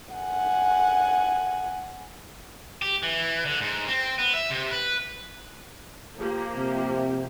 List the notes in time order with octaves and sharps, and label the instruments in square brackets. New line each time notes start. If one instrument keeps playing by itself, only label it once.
[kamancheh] F#5 G#5
[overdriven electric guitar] G4
E3
D3
G#2
C4
B3
E5
C3
B4
[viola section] F3 A#3 G4
[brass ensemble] C3